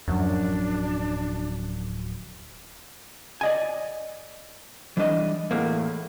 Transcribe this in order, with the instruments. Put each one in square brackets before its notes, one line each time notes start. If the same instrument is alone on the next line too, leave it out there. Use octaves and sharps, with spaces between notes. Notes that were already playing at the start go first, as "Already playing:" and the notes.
[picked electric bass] D1 F3 F#3 [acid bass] F#2 [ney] D4
[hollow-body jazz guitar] D5 D#5 G#5
E3 G3 D4 D#5
E2 A2 A#3